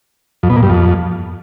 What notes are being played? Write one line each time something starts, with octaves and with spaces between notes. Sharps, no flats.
F2
B2
A#2
G2
F2